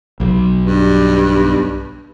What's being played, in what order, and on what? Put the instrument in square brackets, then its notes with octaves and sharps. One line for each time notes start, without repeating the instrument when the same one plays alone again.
[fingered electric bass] B1 F#3
[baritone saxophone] G2